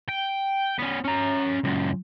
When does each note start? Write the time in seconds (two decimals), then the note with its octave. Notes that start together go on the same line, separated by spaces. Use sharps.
0.09 G5
0.78 B3 C#4
1.04 C#4 A#5
1.64 C#2 F#2